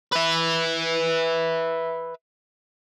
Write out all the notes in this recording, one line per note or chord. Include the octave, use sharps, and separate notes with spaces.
B4 E5